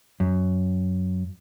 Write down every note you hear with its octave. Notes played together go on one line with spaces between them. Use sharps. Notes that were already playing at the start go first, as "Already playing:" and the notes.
F#2